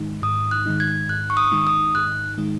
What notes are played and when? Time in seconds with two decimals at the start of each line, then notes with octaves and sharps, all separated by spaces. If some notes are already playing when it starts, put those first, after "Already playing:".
Already playing: G#2 D#3 G#3 D#4
0.22 G#2 D#6
0.51 F#6
0.66 D#3 G#3 D#4
0.80 G#6
1.09 G#2 F#6
1.30 C#6
1.37 D#6
1.52 D#3 G#3 D#4
1.67 D#6
1.94 G#2 F#6
2.38 D#3 G#3 D#4